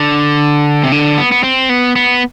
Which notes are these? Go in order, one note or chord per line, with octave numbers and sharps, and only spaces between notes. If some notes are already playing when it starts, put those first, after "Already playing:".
Already playing: D3
C3
D3
B3
B3
C4
B3
B3